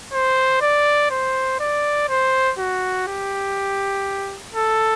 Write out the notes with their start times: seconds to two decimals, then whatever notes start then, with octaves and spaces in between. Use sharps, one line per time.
0.13 C5
0.62 D5
1.11 C5
1.60 D5
2.09 C5
2.58 F#4
3.07 G4
4.55 A4